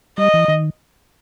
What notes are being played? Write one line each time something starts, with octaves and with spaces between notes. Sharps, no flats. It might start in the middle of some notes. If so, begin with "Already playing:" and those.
G3 D#5
E3
D#3